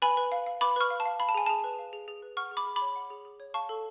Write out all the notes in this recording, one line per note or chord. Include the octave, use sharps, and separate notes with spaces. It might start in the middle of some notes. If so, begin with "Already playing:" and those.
B4 G#5 B5
B4
F5
F5
B4 B5 D6
B4 C#6 F6
F5
A5
F5
F5 B5
A5
G#4 G#5
G#4 A5
B4
F5
G#4
G#4
B4
F#5 C#6 F6
G#4
B5 D6
G#4
B5 D6
C#5
F#5
G#4
G#4
C#5
F5 A5 C#6
A4